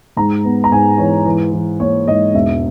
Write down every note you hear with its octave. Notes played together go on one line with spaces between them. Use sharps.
G#2 A#5
B3
A#5
G#2 G#5
E3 C#5
E3
E3
A#3 C#5
G#2 D#5
E1 E5